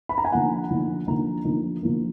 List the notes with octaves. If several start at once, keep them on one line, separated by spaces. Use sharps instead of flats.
B5
A#5
G#5
D3 F3 A#3 D#4 F#5
D3 F3 A#3 D#4
D3 F3 A#3 D#4 A#5
D3 F3 A#3 D#4
D3 F3 A#3